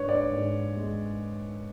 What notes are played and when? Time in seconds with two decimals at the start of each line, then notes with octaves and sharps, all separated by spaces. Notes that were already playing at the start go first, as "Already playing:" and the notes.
Already playing: G#2 D4 B4 C#5
0.09 D5
0.31 G#2
0.76 G#3